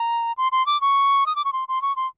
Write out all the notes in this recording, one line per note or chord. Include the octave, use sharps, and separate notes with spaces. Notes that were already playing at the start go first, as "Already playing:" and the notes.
Already playing: A#5
C6
C6
D6
C#6
D#6
D6
C#6
C6
C6
C#6
C6